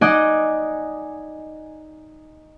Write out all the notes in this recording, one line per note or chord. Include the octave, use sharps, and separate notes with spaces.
D#4 D5 D#5 F#5 G#5